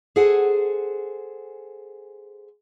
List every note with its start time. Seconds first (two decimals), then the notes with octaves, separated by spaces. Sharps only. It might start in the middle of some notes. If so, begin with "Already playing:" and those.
0.16 G#4 A4 C5 F#5 G#5